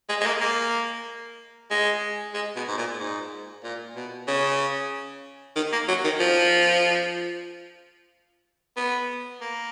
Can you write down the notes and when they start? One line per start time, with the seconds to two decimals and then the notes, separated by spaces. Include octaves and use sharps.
0.09 G#3
0.21 G#3
0.26 A#3
0.41 A#3
1.70 G#3
2.34 G#3
2.56 B2
2.68 G#2
2.78 A#2
2.99 G#2
3.63 A#2
3.96 B2
4.28 C#3
5.56 D#3
5.72 A#3
5.88 F#3
6.04 D#3
6.20 F3
8.77 B3
9.41 A#3